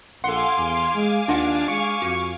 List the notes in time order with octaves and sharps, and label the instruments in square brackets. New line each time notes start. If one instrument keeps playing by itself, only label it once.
[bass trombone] A#1 [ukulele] A4 F#5 [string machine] F5 G#5 D6 [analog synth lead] C6
[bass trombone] E2
G#3
[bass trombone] D#2 [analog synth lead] D4 [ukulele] F4 D#5 F#5
[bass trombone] G#3 [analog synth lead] C#6
[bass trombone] F2 [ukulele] F#4